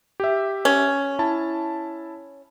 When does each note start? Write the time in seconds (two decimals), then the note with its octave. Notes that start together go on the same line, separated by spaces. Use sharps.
0.20 G4 E5
0.65 C#4
1.19 E4 A5